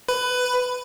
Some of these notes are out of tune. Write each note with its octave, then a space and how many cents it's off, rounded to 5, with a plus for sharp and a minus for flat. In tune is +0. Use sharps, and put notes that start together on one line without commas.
B4 +15